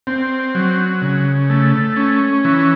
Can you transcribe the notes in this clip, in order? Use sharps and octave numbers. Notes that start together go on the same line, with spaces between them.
C4
F#3
C#3
A3
C#4
E3